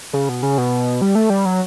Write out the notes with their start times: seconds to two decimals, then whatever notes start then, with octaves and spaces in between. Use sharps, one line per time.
0.13 C#3
0.29 B2
0.43 C#3
0.58 B2
1.01 G3
1.15 A3
1.30 G3
1.45 F#3